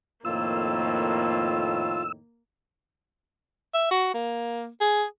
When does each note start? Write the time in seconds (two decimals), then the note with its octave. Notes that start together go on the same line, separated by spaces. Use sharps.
0.25 F2 A2 D#3 A#3 F4 E6
3.74 E5
3.91 F#4
4.14 A#3
4.80 G#4